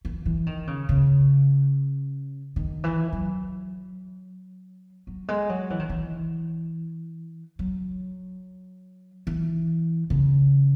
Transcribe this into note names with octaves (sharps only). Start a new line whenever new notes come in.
E3
E3
D#3
C#3
C#3
D#3
E3
F#3
F#3
G#3
F#3
E3
D#3
E3
F#3
E3
C#3